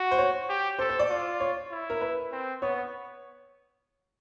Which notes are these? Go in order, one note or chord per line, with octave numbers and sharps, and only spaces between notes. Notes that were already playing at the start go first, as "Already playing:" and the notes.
Already playing: F#4
C5
C#5
G4
A4 C5
C5
D5
F4
C#5
E4
A#4
B4
C4
B3 C#5